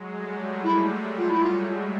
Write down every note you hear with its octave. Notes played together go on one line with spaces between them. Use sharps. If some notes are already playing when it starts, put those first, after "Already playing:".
Already playing: F#3 G#3
G3 A3
E4
F4
E4
F4